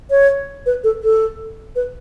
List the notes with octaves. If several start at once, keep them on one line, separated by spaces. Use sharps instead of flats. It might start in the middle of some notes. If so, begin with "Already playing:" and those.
C#5
B4
A4
A4
B4